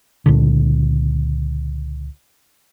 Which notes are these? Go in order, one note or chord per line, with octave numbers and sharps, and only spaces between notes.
C#2 A#2 D3